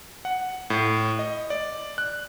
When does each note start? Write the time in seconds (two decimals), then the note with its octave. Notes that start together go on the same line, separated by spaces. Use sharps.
0.25 F#5
0.70 A2
1.19 D#5
1.50 D5
1.98 F#6